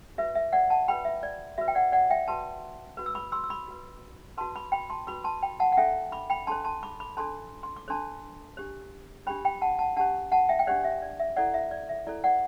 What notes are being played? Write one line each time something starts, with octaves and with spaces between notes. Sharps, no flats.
F#4 B4 E5
E5
D5 F#5
F#5 A5
A5
F#4 B4 G5 B5
E5
D5
F#4 B4 E5
G5
D5 F#5
D5 F#5
E5 G5
F#4 B4 A5 C6
F#4 B4
E6
B5 D6
C6 E6
E6
B5 D6
F#4 B4
F#4 B4 A5 C6
B5 D6
G5 B5
A5 C6
F#4 B4 B5 D6
A5 C6
G5 B5
F#5 A5
F#5
D4 A4 C5 E5 G5
B5 D6
G5 B5
D4 A4 C5 A5 C6
A5 C6
B5 D6
B5 D6
D4 A4 C5 A5 C6
C6
D6
D4 A4 C5 A5 C6
D4 G4 C5
D4 G4 C5 G5 B5
G5 B5
F#5 A5
F#5 A5
D4 G4 C5 F#5 A5
F#5 A5
E5 G5
G5
D4 G4 C5 D5 F#5
E5
D5
E5
E4 A4 C5 D5 F#5
E5
D5
E5
E4 A4 C5 D5
D5 F#5